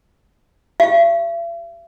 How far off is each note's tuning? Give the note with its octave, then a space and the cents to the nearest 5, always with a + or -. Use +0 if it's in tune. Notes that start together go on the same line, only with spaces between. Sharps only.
G4 +0 E5 +45